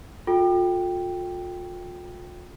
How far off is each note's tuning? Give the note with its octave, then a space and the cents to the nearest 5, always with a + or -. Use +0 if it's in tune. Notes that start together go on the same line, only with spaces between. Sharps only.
F4 +40 A4 +0 G5 +0